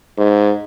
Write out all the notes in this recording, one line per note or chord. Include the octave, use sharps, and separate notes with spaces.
G#2